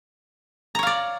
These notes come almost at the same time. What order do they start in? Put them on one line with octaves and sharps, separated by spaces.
A#5 C#5 F5 D5